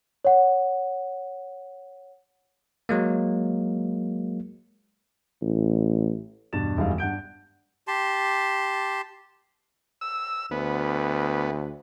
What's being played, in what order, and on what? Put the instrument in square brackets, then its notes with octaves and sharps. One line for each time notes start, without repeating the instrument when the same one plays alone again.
[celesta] C#5 F#5
[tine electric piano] F#3 G#3 A#3
[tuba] A1
[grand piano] E2 G2 B2 A6 E7
E1 F#2 D#3 G3 G#3 F5
G2 F#5 G6 D7
[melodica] G4 A5 C6
[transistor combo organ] E6
[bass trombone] D2 [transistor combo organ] B3